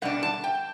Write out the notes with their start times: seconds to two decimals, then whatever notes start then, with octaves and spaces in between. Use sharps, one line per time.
0.02 B2 G3 D4 F#5
0.23 A5
0.44 G5